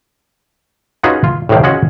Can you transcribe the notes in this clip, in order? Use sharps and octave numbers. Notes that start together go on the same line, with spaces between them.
C#4 D#4 F4 F#4 G#4 B4
F4
A2 C3 D#3 E3 F5 G5
C#4 F4 F#4 G#4 D#5 F#5